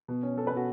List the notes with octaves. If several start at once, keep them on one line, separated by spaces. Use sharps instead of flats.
B2
C#4
C#4 A4
B4
B2 F#4 A4